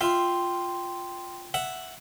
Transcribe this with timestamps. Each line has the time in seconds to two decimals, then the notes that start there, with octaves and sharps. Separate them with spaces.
0.01 F4 E5 G5 C6
1.54 E5 F#5